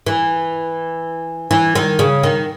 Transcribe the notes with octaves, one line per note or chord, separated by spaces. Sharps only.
E3
E3
D#3
C#3
D#3